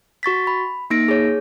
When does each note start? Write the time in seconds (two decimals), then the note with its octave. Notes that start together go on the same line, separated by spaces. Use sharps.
0.23 F#4 C#6 A6 B6
0.47 B5
0.90 A#3 D#4 A#6 D7
1.08 G#4 C#5